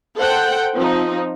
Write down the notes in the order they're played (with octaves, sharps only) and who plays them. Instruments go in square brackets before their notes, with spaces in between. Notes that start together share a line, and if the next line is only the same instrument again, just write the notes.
[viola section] A4 C5 F#5 G5
F3 C4 D#4